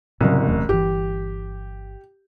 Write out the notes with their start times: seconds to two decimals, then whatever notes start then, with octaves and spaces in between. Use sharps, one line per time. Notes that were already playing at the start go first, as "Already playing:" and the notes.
0.21 F#1 C2 A2 C#3 F#3
0.47 D#1 E2 A3
0.69 G1 E3 G4